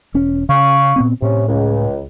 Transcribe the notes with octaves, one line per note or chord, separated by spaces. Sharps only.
E1 C#4
C#3 F5 C#6
A#2 B3 C4
A2 C3 C#4
C#2